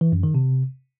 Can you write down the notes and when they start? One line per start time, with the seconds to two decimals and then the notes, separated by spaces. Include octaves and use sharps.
0.01 E3
0.12 F#2
0.23 D#3
0.35 C3